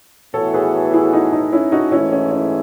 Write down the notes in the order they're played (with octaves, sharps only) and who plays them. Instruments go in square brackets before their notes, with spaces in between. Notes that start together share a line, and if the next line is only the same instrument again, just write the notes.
[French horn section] A2 E3 B3 F#4 [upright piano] A4 C#5
[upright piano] G#4 B4
E4 G#4
D#4
D#4
C#4 E4
D#4 F#4
[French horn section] G#2 E3 A3 [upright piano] C#4 E4
[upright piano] C#4
C#4